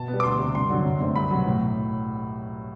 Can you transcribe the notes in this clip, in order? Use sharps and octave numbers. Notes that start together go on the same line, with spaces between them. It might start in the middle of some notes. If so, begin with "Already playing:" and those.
Already playing: B2 A5
B3
G3
D6
D2 C6
C3 G3
G2 C6
D3 F#3
F#2
D3 A3 C4
C2 B5
B2 F#3
A2